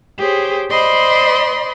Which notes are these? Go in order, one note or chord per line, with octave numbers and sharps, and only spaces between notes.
G4 G#4 C5 C#5
C5 D5 D#5 B5 C6